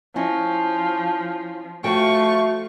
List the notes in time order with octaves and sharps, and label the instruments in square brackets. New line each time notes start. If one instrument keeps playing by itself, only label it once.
[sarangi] F3 [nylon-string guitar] C#4 E4 D#5
[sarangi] F3 [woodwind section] A3 [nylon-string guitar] F#4 G5 [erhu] C#6